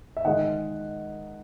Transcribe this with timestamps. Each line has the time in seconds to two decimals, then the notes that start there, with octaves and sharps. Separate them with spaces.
0.17 E5
0.25 D#3 G#3 D#5 F#5